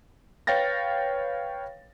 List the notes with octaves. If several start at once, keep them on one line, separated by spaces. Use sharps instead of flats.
B4 C#5 F5 G5 A6 A#6